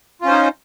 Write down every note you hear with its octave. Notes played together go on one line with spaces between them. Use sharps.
C#4 D#4 F4 C5